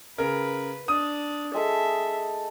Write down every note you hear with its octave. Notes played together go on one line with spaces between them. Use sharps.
C#3 A#4 B4
D4 D#6
G#3 G#4 A4 E5